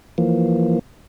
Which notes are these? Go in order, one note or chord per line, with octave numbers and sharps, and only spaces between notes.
E3 F3 A#3